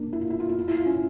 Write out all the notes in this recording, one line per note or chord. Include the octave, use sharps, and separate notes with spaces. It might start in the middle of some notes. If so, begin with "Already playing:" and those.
Already playing: A#3 D4
E4
F4
E4
F4
E4
F4
E4
F4
C#4 E4